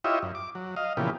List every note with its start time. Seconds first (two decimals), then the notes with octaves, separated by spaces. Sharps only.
0.04 E4 F4 G4 C#5 D#5 E5
0.22 F#2
0.35 D6
0.55 F#3
0.76 D#5 F5
0.97 A#2 C#3 E3 F3 B3 G4